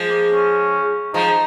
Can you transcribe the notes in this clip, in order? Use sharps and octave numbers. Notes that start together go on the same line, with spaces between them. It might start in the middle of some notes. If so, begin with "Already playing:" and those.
Already playing: F3 G#3
A#3
C#4
F3 G#3 D#4